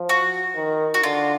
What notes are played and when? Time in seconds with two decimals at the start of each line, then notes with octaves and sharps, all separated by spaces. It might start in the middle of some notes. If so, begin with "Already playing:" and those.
Already playing: F3
0.09 F#4
0.55 D#3
0.94 F#4
1.03 D3 F4